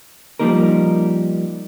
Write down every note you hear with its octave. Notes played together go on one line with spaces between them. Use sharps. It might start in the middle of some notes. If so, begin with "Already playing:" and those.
F3 G3 A#3 D#4 A#4